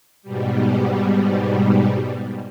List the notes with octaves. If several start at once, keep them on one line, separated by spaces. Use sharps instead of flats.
G#2 B2 G3